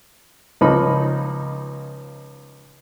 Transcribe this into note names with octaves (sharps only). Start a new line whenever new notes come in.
C#2 F3 D#4 B5